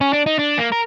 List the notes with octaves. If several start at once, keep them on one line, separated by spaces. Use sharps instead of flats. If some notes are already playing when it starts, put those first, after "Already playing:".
C#4
D4
D#4
D4
A#3
A#4